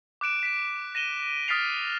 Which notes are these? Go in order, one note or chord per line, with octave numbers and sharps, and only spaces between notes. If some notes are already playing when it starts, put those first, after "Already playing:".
D6 F#6 D7 E7
B6 D7
A#6 D#7 E7 G7
D#6 F6 A6 B6 C7 F7